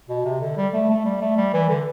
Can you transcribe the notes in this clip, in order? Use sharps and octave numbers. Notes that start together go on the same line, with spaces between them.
B2
C3
D3
G3
A3
A3
G3
A3
G3
E3
D3